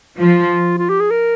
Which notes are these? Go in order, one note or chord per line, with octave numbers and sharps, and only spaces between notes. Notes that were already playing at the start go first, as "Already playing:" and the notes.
F3 F4
F4
G4
G#4
A#4